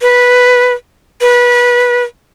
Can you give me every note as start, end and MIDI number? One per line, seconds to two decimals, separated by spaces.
0.01 0.73 71
1.21 2.03 71